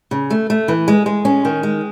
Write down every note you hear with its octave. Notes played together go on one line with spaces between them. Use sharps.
C#3
A3
A3
E3
G#3
G#3
C#4
D#3
G#3